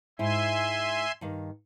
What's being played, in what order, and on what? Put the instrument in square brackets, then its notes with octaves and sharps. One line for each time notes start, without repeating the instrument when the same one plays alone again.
[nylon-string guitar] G#2 E4 [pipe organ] E5 G#5 C6
[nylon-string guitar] G2 D#3 F5